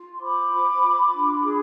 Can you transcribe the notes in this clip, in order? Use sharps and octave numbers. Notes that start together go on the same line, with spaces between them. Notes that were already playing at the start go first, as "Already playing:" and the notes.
Already playing: F4
C6
C5 B5 D6
F4
F4
D4
G#4